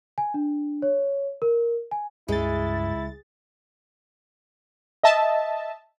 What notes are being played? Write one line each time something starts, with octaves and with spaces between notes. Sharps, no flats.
G#5
D4
C#5
A#4
G#5
C#2 G2 G#3 E4 A6
D#5 E5 A5